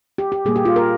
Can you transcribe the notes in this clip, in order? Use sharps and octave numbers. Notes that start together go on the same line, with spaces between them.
G4
G4
A#2 G3 A#3 G#4
G4
F4
A#4